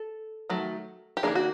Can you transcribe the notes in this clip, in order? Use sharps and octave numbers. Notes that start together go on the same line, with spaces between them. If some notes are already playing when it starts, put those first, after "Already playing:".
Already playing: A4
D#3 F#3 A3
G4
D#3 G3 A#3 D4 G#4
F#4